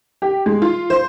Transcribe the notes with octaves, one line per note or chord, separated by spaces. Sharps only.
G4
G#3
F4
C5